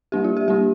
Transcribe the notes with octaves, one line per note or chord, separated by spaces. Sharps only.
G3 A#3 D4 G4
F4
G4
G3 A#3 D4 G4